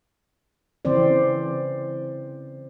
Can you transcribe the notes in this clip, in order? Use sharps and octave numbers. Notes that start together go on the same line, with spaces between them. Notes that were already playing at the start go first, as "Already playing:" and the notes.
C#3 E3 C4 C5 D5